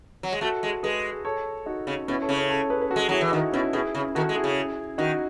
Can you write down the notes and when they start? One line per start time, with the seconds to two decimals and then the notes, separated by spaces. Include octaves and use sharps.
0.23 F#3
0.32 G#3
0.41 A3 F#4 A4
0.63 G#3
0.83 G#3 G#4 B4
1.25 A4 C#5
1.66 D#4 F#4
1.87 C#3
2.08 B2 C#4 E4
2.22 A4 C#5
2.29 C#3
2.36 A4 C#5
2.49 A4 C#5
2.70 G#4 B4
2.81 B4
2.91 F#4 A4
2.96 G#3
3.09 F#3 E4 G#4
3.21 E3
3.32 D#3 D#4 F#4
3.53 B2 C#4 E4
3.73 B2 E4 G#4
3.95 C#3
4.15 D#3 F#4 A4
4.29 G#3
4.36 E4 G#4
4.44 C#3
4.98 D#3 D#4 F#4